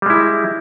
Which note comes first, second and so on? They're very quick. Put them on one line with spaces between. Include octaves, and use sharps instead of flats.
G3 G#3 E4